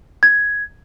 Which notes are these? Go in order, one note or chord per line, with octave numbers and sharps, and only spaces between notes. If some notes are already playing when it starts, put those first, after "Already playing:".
G#6